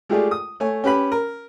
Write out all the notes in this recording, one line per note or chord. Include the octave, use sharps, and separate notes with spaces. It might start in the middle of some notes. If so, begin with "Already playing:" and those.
G#3 A3 F4 G4 G#4 D5
D#6
A3 C#5 G#5
C#4 G4 B4 B5
A#4